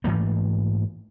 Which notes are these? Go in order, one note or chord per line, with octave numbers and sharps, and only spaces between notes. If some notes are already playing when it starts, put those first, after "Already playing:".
G#2 E3 A3 A#3